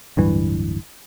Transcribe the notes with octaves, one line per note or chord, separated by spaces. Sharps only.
D1 G2 E3